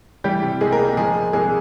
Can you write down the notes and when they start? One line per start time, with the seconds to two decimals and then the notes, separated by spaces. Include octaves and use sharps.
0.24 E3 G3 G4
0.43 C3
0.61 C2 G#3 G#4
0.72 A#3 A#4
0.79 C2
0.97 F3 G#3 G#4
1.15 A#2
1.33 C2 G#3 G#4